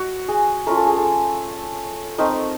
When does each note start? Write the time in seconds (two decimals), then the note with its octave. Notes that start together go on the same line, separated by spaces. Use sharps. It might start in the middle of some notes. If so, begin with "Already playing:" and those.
Already playing: F#4
0.28 G#4
0.67 A3 C#4 F4 A#4
0.77 A4
0.86 G#4
0.96 A4
2.18 A3 C4 D#4 A#4